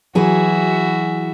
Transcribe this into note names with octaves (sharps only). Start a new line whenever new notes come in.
E3 F#3 F#4 G#4 E5